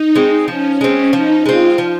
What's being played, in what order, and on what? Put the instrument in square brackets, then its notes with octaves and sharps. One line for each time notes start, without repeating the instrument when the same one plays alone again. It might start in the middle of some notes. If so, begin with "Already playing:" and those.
Already playing: [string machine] D#4
[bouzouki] G#3 C4
[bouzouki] F3 [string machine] C#4
[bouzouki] G#3 C4 [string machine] C#4
[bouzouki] F3 [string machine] D#4
[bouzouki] G#3 C4 [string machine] F4
[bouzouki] F3